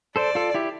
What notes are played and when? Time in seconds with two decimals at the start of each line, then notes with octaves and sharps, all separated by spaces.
0.16 A4 C5 D5
0.35 F4 A4
0.54 E4 G4